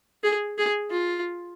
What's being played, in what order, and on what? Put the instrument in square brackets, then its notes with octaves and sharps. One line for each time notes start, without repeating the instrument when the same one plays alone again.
[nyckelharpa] G#4
G#4
F4